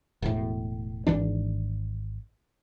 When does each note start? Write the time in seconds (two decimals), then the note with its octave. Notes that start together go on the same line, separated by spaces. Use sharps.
0.22 E1 A2
1.07 G#1 F2 E3 D4